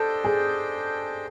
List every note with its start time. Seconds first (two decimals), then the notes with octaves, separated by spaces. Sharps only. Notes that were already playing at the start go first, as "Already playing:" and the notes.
Already playing: D4 G4 A4 C5 D#5 G5
0.24 G#4